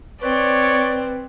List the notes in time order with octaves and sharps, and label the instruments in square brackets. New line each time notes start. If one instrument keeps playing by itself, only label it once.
[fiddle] C4 [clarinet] B4 [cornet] C#5 [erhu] D5